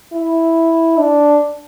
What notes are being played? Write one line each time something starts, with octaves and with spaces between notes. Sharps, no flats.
E4
D4